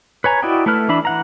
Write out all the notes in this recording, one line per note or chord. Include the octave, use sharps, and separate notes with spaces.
B4 C#5 G#5 A#5
E4 F#4 D5 D#5 G5
A3 E4 A4 B4 F6
E3 D4 E5 B5
E3 F#5 A#5